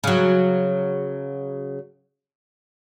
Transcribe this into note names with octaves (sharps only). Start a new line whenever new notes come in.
C#3 F#3